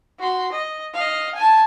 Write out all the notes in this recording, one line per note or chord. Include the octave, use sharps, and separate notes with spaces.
F#4 C6
D#5
D#5 F5
G#5 A5